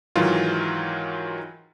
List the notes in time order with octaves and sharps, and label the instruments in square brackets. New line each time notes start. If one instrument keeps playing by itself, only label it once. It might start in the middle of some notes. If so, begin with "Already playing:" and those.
[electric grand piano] G#2 D#3 E3 F#3 F4